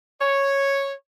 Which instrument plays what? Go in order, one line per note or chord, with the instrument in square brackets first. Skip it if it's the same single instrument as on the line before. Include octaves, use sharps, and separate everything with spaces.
[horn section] C#5